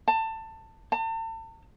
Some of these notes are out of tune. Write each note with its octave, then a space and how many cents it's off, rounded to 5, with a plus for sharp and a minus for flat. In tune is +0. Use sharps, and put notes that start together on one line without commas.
A5 +20
A5 +40